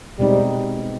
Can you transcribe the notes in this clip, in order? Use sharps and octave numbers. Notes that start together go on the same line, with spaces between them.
B2 G3 G#3 C4 D#4